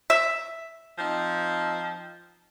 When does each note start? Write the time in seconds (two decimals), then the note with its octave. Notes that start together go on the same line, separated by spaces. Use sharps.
0.10 E5
0.98 F3 C4 D#4